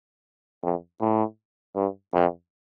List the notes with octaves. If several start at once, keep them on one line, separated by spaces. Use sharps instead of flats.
F2
A2
G2
F2